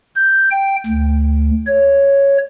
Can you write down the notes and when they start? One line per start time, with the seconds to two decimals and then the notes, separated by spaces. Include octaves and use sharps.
0.15 G6
0.51 G5
0.86 D2
1.67 C#5